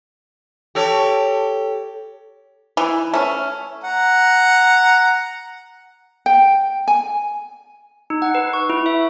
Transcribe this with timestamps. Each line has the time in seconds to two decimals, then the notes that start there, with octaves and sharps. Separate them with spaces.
0.75 G4 A4 C#5
2.77 E3
3.14 A3 C#4
3.84 F#5 A#5
6.26 G5
6.88 G#5
8.10 D#4
8.22 F#5
8.35 B4
8.53 C#6
8.70 E4
8.86 E5